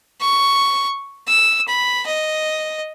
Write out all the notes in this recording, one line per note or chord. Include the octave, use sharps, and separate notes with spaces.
C#6
E6
B5
D#5